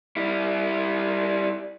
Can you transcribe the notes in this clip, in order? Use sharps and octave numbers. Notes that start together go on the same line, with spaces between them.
G3 E4